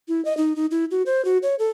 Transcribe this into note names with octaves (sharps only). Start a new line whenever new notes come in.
E4
D#5
D#4
D#4
E4
F#4
C5
F#4
C#5
A4